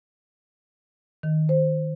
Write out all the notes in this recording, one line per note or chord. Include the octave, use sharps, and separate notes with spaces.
D#3
C5